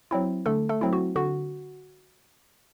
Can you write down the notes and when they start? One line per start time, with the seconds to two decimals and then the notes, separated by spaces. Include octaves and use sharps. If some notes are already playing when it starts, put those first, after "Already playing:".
0.11 F#3 C4 E4
0.46 D3 A3 A4
0.69 A3 A4
0.81 F#3 C4 E4
0.93 F#4
1.16 D3 F#4